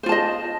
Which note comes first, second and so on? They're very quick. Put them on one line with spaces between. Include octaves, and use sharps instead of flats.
C5 F4 A5 D#5